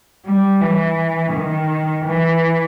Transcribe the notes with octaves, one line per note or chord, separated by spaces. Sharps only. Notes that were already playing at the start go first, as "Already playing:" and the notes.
G3
E3
D#3
E3